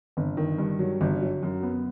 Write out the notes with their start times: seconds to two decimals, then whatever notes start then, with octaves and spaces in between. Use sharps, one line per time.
0.17 G1
0.37 D#3
0.58 G2
0.79 F#3
1.01 G1
1.21 F#3
1.43 F#2
1.63 B3